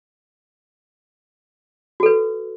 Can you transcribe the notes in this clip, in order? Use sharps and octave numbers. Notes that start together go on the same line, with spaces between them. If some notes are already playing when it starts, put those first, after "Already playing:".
F#4 A4 B4